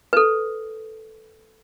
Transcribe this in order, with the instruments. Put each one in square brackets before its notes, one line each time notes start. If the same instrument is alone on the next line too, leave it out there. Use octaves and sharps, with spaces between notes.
[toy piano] A4 B4